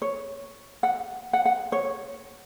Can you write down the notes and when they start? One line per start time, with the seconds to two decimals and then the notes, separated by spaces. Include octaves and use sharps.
0.02 C#5
0.83 F#5
1.33 F#5
1.45 F#5
1.72 C#5